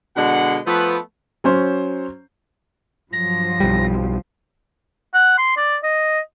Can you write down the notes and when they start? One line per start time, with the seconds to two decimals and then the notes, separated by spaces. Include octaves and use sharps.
0.17 B2 D3 G#3 D4 F#5
0.66 F3 A3 B3 B4
1.44 F#3 C#4 C5
3.12 G2 F3 F#3 A#6
3.60 B1 G3
5.14 F#5
5.38 C6
5.57 D5
5.83 D#5